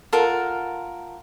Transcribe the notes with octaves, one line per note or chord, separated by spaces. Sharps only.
F4 A4 A#4 F#5